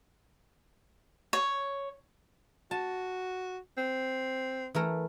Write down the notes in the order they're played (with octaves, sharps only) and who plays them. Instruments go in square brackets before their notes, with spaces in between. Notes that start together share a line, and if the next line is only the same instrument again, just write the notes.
[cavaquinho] C#5
[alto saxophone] F#4 [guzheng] A5
[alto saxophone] C4
[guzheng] E3 A3 A#4